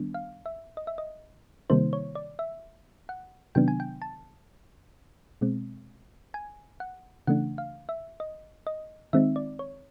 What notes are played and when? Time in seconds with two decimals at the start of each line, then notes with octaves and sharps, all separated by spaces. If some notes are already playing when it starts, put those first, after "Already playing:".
Already playing: D#3 G3 B3 D4
0.14 F5
0.46 E5
0.77 D#5
0.87 E5
0.98 D#5
1.70 C3 D#3 G3 A#3 D#4 C5
1.93 C#5
2.15 D5
2.39 E5
3.09 F#5
3.55 C3 D#3 F#3 B3 D4 G5
3.68 G#5
3.80 G5
4.02 A5
5.41 B2 G#3 C4
6.34 G#5
6.80 F#5
7.27 C#3 E3 A3 D4 F#5
7.58 F5
7.89 E5
8.20 D#5
8.67 D#5
9.13 D#3 G#3 C4 D#4 E5
9.36 D5
9.59 C#5